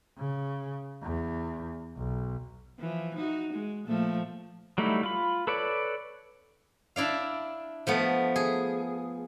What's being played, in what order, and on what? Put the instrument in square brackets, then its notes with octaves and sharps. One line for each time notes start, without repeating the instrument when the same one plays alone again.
[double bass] C#3
E2
B1
[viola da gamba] E3 F3
D#4 F#4
G#3
A#2 F3 A3
[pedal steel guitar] F#3 G3 A3 D#4 E4
F4 B5
A4 B4 C#5 D5
[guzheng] D4 E4 D5 F5
F3 A3 B3
G#4